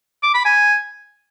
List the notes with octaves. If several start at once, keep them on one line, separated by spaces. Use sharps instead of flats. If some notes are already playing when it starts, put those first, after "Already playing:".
D6
B5
G#5